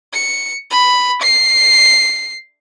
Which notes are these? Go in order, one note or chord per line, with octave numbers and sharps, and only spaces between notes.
C#7
B5
C7